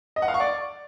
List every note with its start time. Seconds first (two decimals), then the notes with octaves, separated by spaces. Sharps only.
0.16 D#5
0.22 F#5
0.28 F5
0.34 C#6
0.40 D5